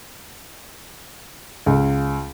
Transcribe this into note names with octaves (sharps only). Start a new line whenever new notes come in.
C#2